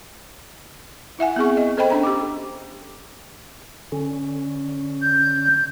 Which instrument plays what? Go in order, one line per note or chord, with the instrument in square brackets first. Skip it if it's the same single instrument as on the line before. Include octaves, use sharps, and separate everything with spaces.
[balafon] E4 E5 F#5 G#5
B3 C4 G#4 C#6
D#5
A4 C5 D#5 G5 B5
C#4 D4 A#5
G4 D6
[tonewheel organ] D3 C#4
[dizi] G6